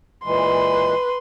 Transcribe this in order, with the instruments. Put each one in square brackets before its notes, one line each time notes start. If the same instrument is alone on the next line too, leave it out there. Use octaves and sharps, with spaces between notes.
[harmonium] A#2 E3 G#3 [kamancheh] B4 C6